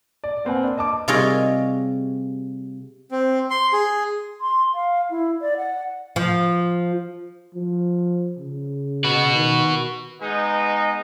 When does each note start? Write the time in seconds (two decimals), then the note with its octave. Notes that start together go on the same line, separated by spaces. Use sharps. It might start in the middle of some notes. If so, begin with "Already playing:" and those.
0.24 D5
0.45 A#3 C4 B4 F#5 G#5
0.64 D4
0.77 D#5 A5 D6
1.08 C3 G3 F4 G#4 C#5 D#5
3.11 C4
3.50 C6
3.73 G#4
4.41 C6
4.74 F5
5.10 E4
5.41 D5
5.57 F#5
6.16 F3
7.55 F3
8.39 C#3
9.04 F#4 B4
9.35 D#3
10.21 G#3 B3 D#4